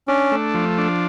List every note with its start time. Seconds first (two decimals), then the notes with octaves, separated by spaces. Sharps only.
0.08 C#4 D4
0.32 A3
0.54 F3
0.78 D4